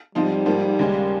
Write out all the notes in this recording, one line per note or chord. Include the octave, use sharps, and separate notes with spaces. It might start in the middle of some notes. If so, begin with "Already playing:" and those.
G#2 F3 G3 C4 D#4
G#2 F3 A#3
D#2 C#3 G#3 C#4